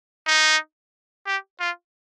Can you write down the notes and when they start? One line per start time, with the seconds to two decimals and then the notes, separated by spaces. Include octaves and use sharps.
0.27 D#4
1.26 G4
1.60 F4